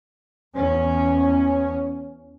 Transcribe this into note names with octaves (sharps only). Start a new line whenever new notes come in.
E2 C#4